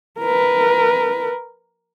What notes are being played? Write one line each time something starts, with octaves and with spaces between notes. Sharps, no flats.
A#4 B4